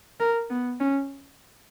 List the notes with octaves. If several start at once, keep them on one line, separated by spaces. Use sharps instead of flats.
A#4
B3
C#4